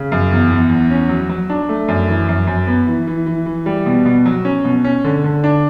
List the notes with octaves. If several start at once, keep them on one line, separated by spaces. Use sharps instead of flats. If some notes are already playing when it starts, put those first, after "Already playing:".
Already playing: C#3
F#2
E2
E2
E2
C#4
F#3
F#3
D4
A3
F#2
E3
F#2
F#2
B3
E3
E3
E3
E3
G3
B2
B2
F#3
C#4
B2
C#4
D3
D3
D4